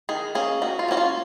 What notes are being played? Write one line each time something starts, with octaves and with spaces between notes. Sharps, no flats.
D#3 G#4
A#3 C#4 G#4
D#3 F#4
F4
A#3 C#4 F#4
F4